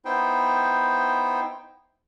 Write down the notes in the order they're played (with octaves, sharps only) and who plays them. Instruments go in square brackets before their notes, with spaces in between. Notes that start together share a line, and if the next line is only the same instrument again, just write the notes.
[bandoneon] B3 D#4 E4 C5 G5